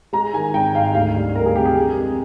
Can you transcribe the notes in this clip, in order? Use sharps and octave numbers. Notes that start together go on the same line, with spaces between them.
G#3 A#5
D#3 G#5
G#1 G5
G#2 F5
D2 F5
G3
D2 A#4
G#4
C3 G4
G#4
F2
G#3